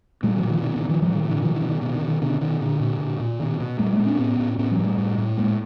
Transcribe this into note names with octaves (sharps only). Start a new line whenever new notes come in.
A#2 G3 A3
E3 F#3
A#2
D#3 F3
B2 D#3
D#3
B2
D#3 F3
A2 F3 G3
D#3
A2
D3 E3
B2 D#3 F3
D3 E3
B2
D#3
B2 D#3
D#3
B2
D#3
B2 D3
B2 D#3
A#2 D3
A#2
A#2
A#2
B2 D#3
B2
A#2 G3 A3
G#3 A#3
A#2
C4 D4
A2 B3 C#4
A2
A2 B3 C#4
F3 G3
A2
G3 A3
A2
A2
A2 G#3 A#3